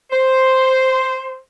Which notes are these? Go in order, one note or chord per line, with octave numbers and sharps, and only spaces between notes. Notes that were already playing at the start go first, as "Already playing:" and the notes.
C5